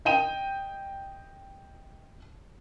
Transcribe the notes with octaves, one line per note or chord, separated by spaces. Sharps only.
D#5 G5 D#7